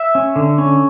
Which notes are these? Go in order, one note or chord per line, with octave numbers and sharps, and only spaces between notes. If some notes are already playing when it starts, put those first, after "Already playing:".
Already playing: E5
C#4
D3
C#4